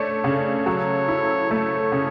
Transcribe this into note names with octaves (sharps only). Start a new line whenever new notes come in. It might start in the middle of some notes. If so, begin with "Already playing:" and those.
Already playing: A3 D4 A4 C#5
C#3
F#3
E4
A3 A4 C#5
C#3